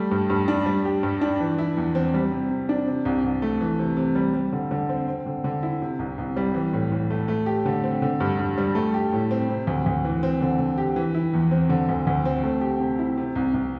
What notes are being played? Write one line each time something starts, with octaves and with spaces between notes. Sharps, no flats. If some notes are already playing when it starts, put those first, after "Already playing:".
Already playing: G3 A3
G2
G2
D4
G3
G4
G2
D4
E3
E4
E2
C4
G3
C3
C3
D4
C3
C2
C2
A3
E3
C3
C3
G3
G3
D3
D3
C4
C4
D3
D3
E4
C3
C2
C2
G3
E3
A2
A2
A3
A3
G4
D3
C4
D3
G2
G2
G3
A3
G4
A2
C4
C3
D2
D2
E3
C4
D3
D3
G4
E3
E4
E2
C4
D3
D2
D2
C4
A3
G4
C3
E4
C3
C2
C2